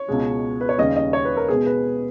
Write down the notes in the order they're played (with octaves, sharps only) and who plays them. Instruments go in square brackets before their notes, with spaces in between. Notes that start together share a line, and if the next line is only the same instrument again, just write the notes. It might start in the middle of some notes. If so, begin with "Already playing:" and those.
Already playing: [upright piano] C#5
C#2 B2 G#3
B4
C#5
D#2 C#3 G3 C#4 D#5
D#5
C#5
B4
A#4
B2 G#3 B3 G#4
B4